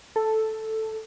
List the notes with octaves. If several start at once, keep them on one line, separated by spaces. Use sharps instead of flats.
A4